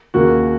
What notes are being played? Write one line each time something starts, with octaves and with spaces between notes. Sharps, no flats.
D#2 C#3 A#3 F#4